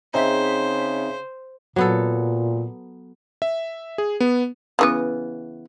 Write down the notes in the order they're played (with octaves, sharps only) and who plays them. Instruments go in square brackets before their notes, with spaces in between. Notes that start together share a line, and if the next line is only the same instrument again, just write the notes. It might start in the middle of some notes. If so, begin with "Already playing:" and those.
[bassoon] C#3 [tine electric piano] C4 D#4 [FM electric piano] G#4 E5 B6 [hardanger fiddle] C5
[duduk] A#2 [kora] F#3 B3 A4
[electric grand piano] E5
G#4
B3
[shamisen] C#3 E3 B3